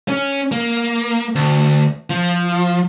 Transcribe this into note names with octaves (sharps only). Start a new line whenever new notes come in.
C#4
A#3
D2
F3